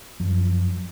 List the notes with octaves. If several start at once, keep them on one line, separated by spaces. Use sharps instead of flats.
F#2 F3